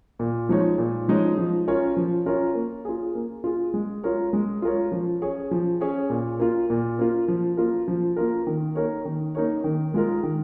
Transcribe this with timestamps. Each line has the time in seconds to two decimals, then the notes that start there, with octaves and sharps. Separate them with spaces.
0.19 A#2
0.49 F3 G#3 D#4 C#5
0.78 A#2
1.08 F3 G#3 D#4 C#5
1.38 F3
1.68 C#4 F4 A#4 C#5
1.97 F3
2.26 C#4 F4 A#4 C#5
2.55 A#3
2.85 F4 G#4
3.15 A#3
3.44 F4 G#4
3.74 G#3
4.04 F4 A#4 C#5
4.33 G#3
4.62 F4 A#4 C#5
4.92 F3
5.22 C#4 G#4 C#5
5.51 F3
5.81 C#4 G#4 C#5
6.10 A#2
6.40 A#3 F4
6.70 A#2
6.99 A#3 F4
7.28 F3
7.57 A#3 F4 A#4
7.88 F3
8.16 A#3 F4 A#4
8.47 D#3
8.75 A#3 D#4 A#4 C#5
9.05 D#3
9.35 A#3 D#4 A#4 C#5
9.64 D#3
9.94 G#3 F4 A#4
10.23 D#3